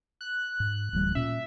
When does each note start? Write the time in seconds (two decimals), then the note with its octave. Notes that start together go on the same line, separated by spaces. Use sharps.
0.21 F#6
0.60 G#2
0.93 D1 A1 G3
1.15 A#2 C#4 E5